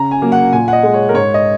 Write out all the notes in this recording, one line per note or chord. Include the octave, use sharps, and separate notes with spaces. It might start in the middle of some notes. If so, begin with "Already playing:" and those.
Already playing: C#3 A#5
G#5
F#3 A#3
F#5
A#2 G#5
F#5
D#5
G#3
C#5
A#4
G#2 C#5
D#5